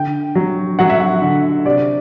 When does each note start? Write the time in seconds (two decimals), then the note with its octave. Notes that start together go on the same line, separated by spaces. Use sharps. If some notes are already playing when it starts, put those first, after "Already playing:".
Already playing: D3 G5
0.35 F#3
0.79 F#3 F#5
0.90 E5
1.00 F#5
1.22 D3
1.65 C3 D5